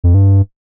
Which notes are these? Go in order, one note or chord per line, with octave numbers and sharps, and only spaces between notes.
F2
G2